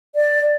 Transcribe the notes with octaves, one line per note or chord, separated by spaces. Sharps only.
D5